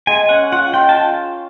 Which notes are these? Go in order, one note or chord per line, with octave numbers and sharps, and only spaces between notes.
G#3 G#5
C#4 F#5
F4 F#5
F4 G5
A5